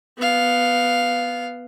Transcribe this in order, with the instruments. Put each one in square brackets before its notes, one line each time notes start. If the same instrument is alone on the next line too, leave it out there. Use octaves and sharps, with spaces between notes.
[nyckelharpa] B3 F5